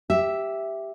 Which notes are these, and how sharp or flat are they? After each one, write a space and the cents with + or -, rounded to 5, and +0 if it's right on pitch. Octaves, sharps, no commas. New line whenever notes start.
G4 +0 E5 +0